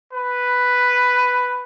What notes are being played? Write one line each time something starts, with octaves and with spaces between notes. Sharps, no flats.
B4